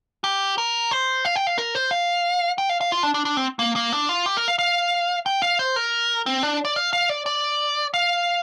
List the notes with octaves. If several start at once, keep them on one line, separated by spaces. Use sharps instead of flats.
G4
A#4
C5
F5
G5
F5
A#4
C5
F5
G5
F5
F5
F4
D4
D4
D4
C4
A#3
A#3
D4
F4
G4
A#4
F5
F5
G5
F5
C5
A#4
C4
D4
D5
F5
F5
D5
D5
F5